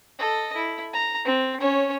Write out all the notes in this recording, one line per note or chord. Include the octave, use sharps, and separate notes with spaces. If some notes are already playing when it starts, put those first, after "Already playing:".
A4 D#5
E4
A#5
C4
C#4 C#5